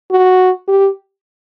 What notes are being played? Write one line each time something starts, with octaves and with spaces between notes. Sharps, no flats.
F#4
G4